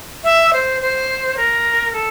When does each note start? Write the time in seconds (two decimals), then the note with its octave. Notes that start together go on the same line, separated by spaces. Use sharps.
0.24 E5
0.53 C5
0.81 C5
1.37 A#4
1.93 A4